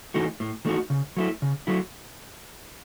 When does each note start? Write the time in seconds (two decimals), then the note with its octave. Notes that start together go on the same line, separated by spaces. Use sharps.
0.14 E3 A3 D#4 F#4
0.40 A2
0.65 E3 A3 D#4 F#4
0.90 C#3
1.17 F#3 A3 E4
1.42 C#3
1.67 F#3 A3 E4